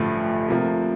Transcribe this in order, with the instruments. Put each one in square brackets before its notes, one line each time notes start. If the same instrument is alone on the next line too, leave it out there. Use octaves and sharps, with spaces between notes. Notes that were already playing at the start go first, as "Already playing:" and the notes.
Already playing: [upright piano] A1 G2 D3 F3 [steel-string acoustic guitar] A3
[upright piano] C3 F3 A#3